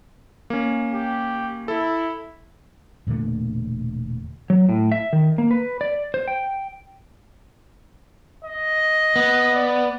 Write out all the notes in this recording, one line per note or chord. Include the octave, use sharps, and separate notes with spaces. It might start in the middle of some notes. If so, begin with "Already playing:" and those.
A#3 C#4
G4
E4 A4
E1 A#2 D3 A3
F#3
A2
E5
D#3
A#3
B4
D5
C5
G5
D#5
B3
D5